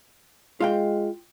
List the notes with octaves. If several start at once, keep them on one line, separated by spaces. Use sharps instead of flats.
G#3 F4 F5 G5